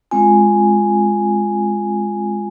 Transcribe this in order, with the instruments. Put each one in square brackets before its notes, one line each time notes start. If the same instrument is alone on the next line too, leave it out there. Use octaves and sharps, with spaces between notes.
[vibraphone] G#3 C4 F4 G#5